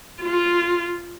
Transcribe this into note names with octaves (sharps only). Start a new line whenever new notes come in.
F4